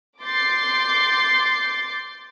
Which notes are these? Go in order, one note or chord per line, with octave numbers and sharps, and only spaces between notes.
C6 D6 G6 A6 C7